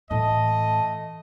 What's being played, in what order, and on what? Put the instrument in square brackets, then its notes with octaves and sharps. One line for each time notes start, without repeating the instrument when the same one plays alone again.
[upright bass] A2 E3 [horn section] A3 D#5 [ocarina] A5